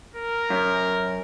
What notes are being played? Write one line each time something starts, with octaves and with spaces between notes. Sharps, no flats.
A#4
F#2